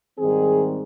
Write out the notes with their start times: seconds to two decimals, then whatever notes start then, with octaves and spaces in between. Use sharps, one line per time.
0.18 G#2 D#3 G3 C4 G#4